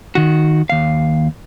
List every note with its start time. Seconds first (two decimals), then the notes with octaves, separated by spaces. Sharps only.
0.15 D#3 F#4
0.70 D#2 F5